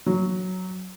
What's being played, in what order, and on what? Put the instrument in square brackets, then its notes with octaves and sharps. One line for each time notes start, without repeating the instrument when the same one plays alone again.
[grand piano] F#3